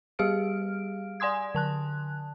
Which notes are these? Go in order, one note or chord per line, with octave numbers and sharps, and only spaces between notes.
G3 G4 G#4 F5 F6 D7
D5 G#5 C6 D#6 G#6
D3 A5 F#6